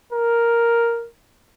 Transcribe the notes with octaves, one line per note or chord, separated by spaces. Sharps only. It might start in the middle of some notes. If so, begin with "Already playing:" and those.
A#4